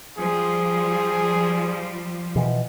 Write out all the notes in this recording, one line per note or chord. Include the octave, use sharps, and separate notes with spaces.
F3 G3 G#4
B2 E3